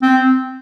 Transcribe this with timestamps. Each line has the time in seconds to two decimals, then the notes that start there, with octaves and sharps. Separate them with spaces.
0.02 C4